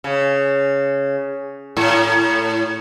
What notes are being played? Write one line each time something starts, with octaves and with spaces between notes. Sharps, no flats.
C#3
A2